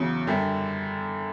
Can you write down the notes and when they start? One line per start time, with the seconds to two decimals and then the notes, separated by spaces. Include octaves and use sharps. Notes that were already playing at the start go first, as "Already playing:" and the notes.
Already playing: E2 C#3 F#3
0.27 F#2 D3 G3